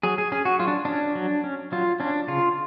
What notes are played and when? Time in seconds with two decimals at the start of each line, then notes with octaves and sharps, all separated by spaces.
0.03 F#3 G#4
0.18 G#4
0.32 C#4 G#4
0.45 F#4
0.59 F#3 F4
0.68 D4
0.85 C#4 D4
1.15 F#3
1.44 C#4
1.72 F#3 F4
2.00 C#4 D4
2.28 C#3 F4